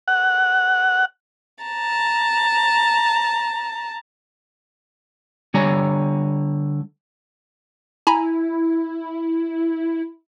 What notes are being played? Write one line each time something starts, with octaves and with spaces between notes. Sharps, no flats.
F#5
A5 A#5
D3 G3 C#5 G#5 A#5
E4 G#5 A#5 B5